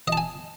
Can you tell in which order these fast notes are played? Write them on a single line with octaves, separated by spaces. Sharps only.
D#5 A5 G#5